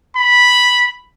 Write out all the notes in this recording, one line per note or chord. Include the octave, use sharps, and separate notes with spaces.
B5